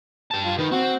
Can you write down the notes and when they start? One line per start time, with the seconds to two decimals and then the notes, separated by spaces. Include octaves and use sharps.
0.31 G4 A5
0.45 F4
0.59 D#3 D#4 B4
0.72 C4 F#4